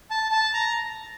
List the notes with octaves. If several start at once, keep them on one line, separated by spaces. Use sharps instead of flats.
A5
A5
A#5